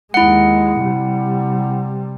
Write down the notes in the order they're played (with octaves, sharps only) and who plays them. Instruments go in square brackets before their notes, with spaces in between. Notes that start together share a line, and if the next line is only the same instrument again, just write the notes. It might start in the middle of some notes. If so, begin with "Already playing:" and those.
[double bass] D#2 G#3 [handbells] E4 F#5
[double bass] C3 G3